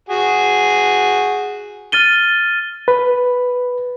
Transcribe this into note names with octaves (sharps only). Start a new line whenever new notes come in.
F#4 G#4
F6 A6 D#7 G7
B4